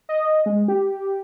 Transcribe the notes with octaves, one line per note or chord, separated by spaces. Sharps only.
D#5
G#3
G4